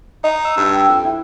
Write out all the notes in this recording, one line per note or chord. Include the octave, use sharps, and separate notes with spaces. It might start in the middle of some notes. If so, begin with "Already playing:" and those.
D#4 D#5
E6
G2
G5
F2
E4